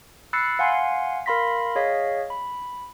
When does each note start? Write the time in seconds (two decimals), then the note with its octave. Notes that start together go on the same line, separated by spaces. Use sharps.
0.33 B5 E6 F#6 A6 C7 C#7
0.59 F5 F#5 G#5 C6
1.26 A#4 F5 B5 C6 A#6 B6
1.75 G#4 C#5 D#5 F5 B6
2.30 B5